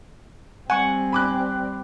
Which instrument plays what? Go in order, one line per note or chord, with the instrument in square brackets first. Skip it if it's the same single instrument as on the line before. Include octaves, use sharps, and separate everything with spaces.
[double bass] G3 C4 [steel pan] F#5 C#6 [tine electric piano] G#5
[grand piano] B5 D6 F#6